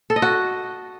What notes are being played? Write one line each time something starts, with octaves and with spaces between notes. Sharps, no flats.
A4
D#5
F#4